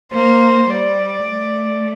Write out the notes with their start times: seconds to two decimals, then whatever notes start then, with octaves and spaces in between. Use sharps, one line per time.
0.13 A#3 C5
0.69 G3 D5
1.26 A3